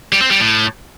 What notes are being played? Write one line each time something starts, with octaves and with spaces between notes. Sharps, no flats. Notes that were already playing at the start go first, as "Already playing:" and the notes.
G3
C4
G3
A2